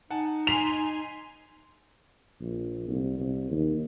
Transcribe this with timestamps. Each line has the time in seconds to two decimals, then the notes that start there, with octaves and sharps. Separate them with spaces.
0.11 D#4 F#5 G#5 A5
0.47 G#5 A#5 C6 B6 C7 F7
2.40 A#1
2.88 C2
3.19 C2
3.51 D#2